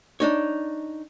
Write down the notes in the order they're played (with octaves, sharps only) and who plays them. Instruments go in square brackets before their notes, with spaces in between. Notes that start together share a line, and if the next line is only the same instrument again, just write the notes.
[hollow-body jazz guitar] D4 D#4 C#5